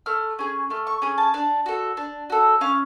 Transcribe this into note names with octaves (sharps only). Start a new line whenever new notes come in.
A3 F6
C#4 G#4
A3 F6
C#6
C#4 G#4
A5
D4
F#4 A4
D4
F#4 A4
C#4 F5